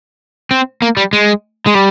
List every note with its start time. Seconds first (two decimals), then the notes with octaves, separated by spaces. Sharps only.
0.51 C4
0.82 A#3
0.97 G3
1.13 G#3
1.66 G#3
1.74 G3